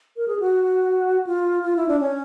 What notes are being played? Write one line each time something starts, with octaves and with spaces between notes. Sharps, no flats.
A#4
G#4
F#4
F4
F4
E4
D4
C#4